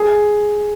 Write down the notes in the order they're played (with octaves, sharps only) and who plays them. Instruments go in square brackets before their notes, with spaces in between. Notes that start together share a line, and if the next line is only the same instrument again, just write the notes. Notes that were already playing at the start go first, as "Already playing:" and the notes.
Already playing: [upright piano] G#4